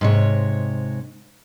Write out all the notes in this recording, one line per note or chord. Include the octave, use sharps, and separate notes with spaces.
G#2 C3 C#5